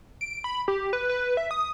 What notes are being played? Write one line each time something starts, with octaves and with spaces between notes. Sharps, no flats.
D7
B5
G4
B4
B4
E5
D#6